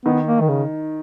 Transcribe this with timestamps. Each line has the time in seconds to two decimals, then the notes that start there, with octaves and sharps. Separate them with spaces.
0.05 D#3 B3
0.26 A#3
0.41 D#3
0.48 C#3